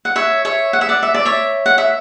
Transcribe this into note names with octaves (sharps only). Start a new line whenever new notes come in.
F#5
C#5 E5
C#5 E5
F#5
E5
D5 F#5
E5
D5
C#5 E5
F#5
E5